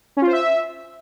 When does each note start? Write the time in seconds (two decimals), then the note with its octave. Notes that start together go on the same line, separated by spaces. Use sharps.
0.17 C#4
0.22 F4
0.27 C5
0.33 E5